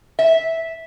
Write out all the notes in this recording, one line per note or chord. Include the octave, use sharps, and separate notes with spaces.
E5